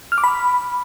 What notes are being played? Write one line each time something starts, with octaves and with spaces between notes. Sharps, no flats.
F6
D6
B5